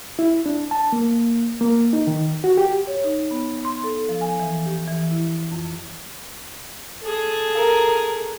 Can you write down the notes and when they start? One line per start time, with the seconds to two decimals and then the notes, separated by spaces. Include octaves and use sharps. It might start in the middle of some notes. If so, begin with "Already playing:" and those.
0.19 E4
0.46 D4
0.71 A5
0.92 A#3
1.61 A#3
1.93 D#4
2.07 D#3
2.44 F#4
2.58 G4
2.87 C#5
3.04 D#4
3.31 B3
3.65 C6
3.84 A4
4.09 F3
4.21 G#5
4.40 E3
4.66 G4
4.88 E3
5.11 E4
5.52 F2
7.02 G#4 A4
7.56 A#4